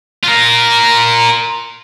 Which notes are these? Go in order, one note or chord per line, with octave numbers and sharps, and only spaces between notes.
F4 A#4